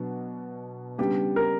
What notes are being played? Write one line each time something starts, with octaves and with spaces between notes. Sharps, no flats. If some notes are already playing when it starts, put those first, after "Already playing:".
Already playing: B2 F#3 B3 D4
C#3 G3 B3 D4 G4
A#4